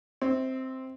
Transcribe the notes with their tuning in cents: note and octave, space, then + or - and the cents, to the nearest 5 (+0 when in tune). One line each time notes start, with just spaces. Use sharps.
C4 +0 E5 -40